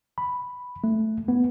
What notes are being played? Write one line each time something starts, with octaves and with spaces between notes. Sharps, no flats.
B5
A3
B3